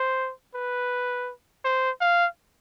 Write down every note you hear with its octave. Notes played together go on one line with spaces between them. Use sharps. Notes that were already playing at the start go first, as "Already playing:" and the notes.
Already playing: C5
B4
C5
F5